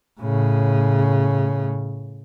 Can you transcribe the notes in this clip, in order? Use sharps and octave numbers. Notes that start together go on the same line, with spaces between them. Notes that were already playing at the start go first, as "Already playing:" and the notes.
A2 C#3